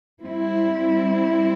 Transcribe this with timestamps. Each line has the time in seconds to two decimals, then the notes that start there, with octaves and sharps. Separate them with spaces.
0.22 G3 C4 E4